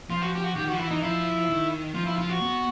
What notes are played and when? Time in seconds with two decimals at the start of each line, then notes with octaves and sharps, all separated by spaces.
0.10 F3 F4
0.22 F#4
0.35 G4
0.44 F#4
0.56 D#3 G4
0.68 F#4
0.72 F3
0.79 E3 E4
0.91 D#4
1.02 F3 E4
1.49 D#3
1.95 F3 F4
2.06 E4
2.18 F4
2.29 F#4
2.41 B3